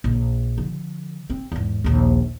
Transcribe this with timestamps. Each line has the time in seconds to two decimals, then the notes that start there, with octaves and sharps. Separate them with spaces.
0.04 A#1
0.58 D3 F3
1.30 C4
1.52 E2 G#2
1.84 A#1 D#2